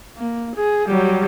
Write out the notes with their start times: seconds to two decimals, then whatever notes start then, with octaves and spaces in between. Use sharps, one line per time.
0.17 A#3
0.55 G#4
0.88 F#3 G3